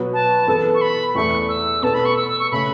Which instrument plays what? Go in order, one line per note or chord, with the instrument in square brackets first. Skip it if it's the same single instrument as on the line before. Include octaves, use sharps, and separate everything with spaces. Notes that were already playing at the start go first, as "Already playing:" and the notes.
Already playing: [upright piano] B2 F#3 B3 F#4 B4
[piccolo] A5
[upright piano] E3 B3 A4
[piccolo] C#6
B5
[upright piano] E2 E3 A3 [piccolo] C#6
[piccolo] E6
[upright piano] B2 B3 A4 [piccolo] A5
[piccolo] B5
C#6
E6
E6
C#6
[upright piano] C#3 A3 C#4 [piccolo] B5